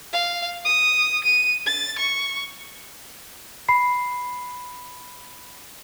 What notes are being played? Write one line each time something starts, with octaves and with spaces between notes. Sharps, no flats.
F5
D#6
D#7
A6
C#6
B5 C7